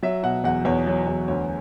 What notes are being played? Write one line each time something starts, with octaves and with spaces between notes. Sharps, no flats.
F#3 E5
B2 F#5
E2 F#5
E2 C#5
F#3
E2
D2 C#5